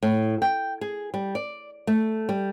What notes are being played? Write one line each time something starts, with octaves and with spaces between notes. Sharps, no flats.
A2
G5
G#4
G3
D5
A3
G3